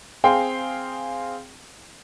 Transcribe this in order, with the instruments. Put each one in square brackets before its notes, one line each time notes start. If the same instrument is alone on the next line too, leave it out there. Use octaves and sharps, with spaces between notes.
[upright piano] C4 G#4 F5 G5 G#5 C6